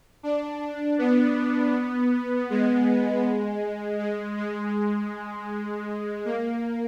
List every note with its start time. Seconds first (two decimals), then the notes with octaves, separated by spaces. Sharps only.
0.23 D4
0.98 B3
2.50 G#3
4.00 G#3
4.37 G#3
6.25 A#3